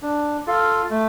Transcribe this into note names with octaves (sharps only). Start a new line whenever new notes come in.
D4
F4 A4 F5
A3